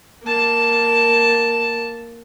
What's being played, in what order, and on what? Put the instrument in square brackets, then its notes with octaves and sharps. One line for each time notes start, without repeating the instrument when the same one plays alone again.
[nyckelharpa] A#3 A5